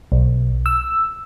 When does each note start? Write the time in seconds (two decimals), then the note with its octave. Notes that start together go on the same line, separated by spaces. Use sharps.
0.12 B1
0.66 E6